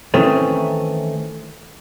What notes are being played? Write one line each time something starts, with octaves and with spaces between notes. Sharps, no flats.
D#3 E3 A3 C4 C#4